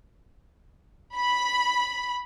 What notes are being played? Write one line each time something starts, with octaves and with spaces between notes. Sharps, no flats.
B5